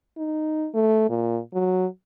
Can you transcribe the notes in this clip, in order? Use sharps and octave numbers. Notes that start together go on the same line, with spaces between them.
D#4
A3
A#2
F#3